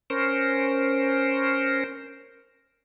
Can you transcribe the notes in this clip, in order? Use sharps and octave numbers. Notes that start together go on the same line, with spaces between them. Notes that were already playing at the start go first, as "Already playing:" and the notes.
C#4 A#4 C5